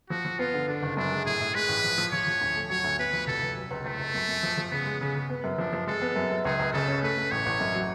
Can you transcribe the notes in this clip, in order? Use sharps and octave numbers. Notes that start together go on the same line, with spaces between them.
F3 F#4
F3
B3 F4
D3
D3 D4
F#1
F#2 D4
G#3
A2 G#4
A2
G#3 B4
A1
F3
F3
F3 C#5
F3
D2
A3
F#3 C#5
D2
B3 B4
F3
F1 A4
F1
F#3
C#2
C#2 A3
C#2
F#2
F#2
F3
F3
C#3 B3
G#3
C#3 B3
C#3
B3
F#2
F3 D4
F3
G#3 A4
B3
F#2
F#2
C#2 G#4
C#2
C#3 A4
C#4
A3 B4
A3
A1 C#5
A1
F#2
F#3